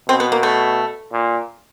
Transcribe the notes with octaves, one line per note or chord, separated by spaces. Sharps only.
B2 C4
B3
A#3
A3
A#2